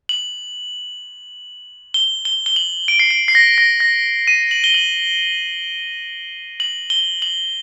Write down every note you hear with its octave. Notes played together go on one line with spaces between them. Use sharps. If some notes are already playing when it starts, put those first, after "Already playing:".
F#7
G7
G7
G7
F#7
D7
C7
D7
C7
A#6
A#6
A#6
D#7
F#7
G7
F#7
F#7
G7
F#7